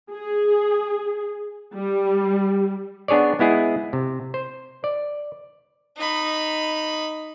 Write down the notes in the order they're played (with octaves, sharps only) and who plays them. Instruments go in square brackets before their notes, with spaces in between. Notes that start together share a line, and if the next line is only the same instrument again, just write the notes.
[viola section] G#4
G3
[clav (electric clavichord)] B3 D4 G#4 C#5 D5
G#3 B3 E4 G#4
C3
C5
D5
[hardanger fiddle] D#4 B5